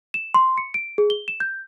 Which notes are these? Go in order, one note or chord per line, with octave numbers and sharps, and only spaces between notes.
E7
C6
C#7
D7
G#4
G7
E7
G6